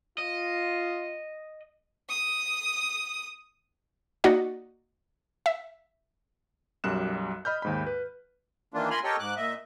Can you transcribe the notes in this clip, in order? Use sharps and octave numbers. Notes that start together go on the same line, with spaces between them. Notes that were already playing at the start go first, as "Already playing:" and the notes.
F4 D#5
D#6
A#3 D#4 F#4 D5 D#5 F#5
E5
B1 F#2 G3 F#6 E7
D#5 B5 F6 G6
D#2 G#2 B5
B4
D#3 E3 A#3 D4 F4
F4 A#4 G#5 B5 C6 F6
G4 A4 A#4 C#5 D#5 G5
G#2 D6 F#6
A#2 D#5 E5